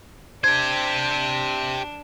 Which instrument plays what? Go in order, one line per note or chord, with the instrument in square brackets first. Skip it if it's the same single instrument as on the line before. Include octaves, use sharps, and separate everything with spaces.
[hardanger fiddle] D4 [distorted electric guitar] G4 C5 [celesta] G#6